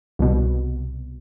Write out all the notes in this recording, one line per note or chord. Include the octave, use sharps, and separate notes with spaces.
C2 B2